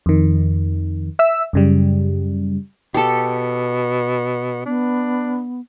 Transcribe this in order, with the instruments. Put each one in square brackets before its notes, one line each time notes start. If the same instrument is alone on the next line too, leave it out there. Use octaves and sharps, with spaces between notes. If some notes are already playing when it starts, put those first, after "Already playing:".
[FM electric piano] F2 D#3
E5 E6
F#2 C#3 G3
[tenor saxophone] B2 [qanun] G4 A4
[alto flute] B3 [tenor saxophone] D4